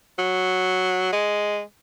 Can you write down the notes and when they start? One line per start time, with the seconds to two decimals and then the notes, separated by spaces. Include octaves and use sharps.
0.19 F#3
1.12 G#3